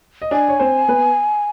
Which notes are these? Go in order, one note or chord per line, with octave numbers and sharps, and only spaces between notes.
D#5
D4 D5 G#5
C#5
C4 C5
B3 B4